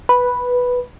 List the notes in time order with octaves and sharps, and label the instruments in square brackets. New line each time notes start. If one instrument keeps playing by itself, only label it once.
[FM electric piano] B4